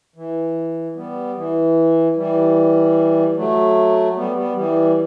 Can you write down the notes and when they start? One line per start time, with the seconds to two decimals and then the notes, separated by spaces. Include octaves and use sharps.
0.16 E3
0.96 G3 B3
1.36 E3
2.16 E3 G3
3.36 F#3 A3
4.16 G3 B3
4.36 G3 B3
4.56 E3 G3